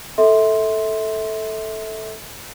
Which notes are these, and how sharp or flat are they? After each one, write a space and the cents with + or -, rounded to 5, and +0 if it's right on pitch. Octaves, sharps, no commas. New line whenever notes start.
A4 +0 E5 -25 C6 +0